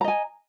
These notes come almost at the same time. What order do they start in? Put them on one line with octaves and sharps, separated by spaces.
A#5 D#5 G#5